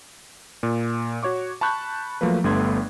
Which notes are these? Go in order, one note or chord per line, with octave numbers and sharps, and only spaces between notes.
A#2
F#4 C#5 C#6 D6
A5 B5 C#6 F#6 G6
F3 F#3 A3 A#3 B4
G1 G2 A3 B3 C6 G#6